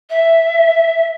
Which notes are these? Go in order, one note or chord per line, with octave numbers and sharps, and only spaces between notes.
E5